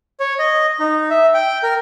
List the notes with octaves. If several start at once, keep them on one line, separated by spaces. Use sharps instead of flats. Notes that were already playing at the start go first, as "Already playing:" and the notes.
C#5
D#5
D#4
E5
G5
A#4